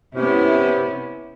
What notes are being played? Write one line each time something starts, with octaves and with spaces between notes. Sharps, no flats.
C3 B3 C#4 E4